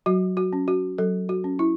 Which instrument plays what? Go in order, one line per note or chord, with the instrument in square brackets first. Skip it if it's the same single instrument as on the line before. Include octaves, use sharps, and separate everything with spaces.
[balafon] F#3 F#4
F#4
C#4
F#4
F#3 A4
F#4
C#4
E4